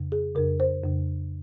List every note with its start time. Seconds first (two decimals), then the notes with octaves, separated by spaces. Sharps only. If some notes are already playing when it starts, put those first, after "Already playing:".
Already playing: F2 C#3
0.12 G#4
0.35 F2 C#3 A#4
0.60 C5
0.84 F2 C#3